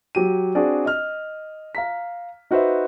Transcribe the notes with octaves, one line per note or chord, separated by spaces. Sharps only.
F#3 G4 D#7
C4 D4 F#4 G#4 D5
D#5 F6
F5 A#5 B6
D#4 F#4 B4 C5 E5